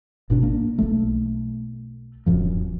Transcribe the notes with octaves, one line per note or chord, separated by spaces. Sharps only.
G#1 B2 D4
A#3
B1 A3
D1 F#2 F3